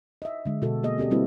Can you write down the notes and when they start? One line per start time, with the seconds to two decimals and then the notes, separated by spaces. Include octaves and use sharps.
0.22 D#5 E5
0.45 D3 G#3
0.62 B2 F#4 A4
0.83 A#3 G#4 D#5
0.98 C4 G4 A4 D5
1.11 G3 A#3 C4 E4 F#4 B4